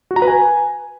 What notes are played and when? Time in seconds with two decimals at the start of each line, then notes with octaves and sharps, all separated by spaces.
0.11 F#4
0.16 A#5
0.22 B4
0.28 G#5